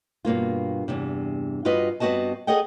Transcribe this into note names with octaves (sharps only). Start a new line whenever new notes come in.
G2 B2 A#3 F4
E2 G2 C3
G2 F4 F#4 B4 D#5
G2 B3 C4 F#4 D#5 A5
G#4 A4 D5 D#5 F#5 G5